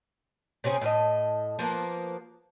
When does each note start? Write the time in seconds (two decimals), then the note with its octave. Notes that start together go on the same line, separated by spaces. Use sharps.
0.64 C3 C4 C#4 G#4
0.81 A2 F4 D#5
1.59 F3 A#3 B3